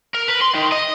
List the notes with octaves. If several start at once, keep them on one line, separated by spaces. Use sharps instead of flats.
A#4
B4
C6
D#3
D#5